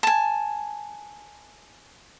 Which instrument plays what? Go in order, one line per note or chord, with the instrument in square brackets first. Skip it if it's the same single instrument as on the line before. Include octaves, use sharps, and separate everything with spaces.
[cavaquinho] G#5 A5